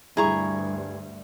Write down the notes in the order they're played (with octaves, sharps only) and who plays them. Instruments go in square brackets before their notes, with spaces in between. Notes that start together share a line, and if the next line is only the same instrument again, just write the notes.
[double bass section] D2 G2 [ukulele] E4 A#5 [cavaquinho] G#4 C#6